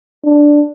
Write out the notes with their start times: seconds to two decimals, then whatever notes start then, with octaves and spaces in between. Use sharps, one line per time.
0.25 D4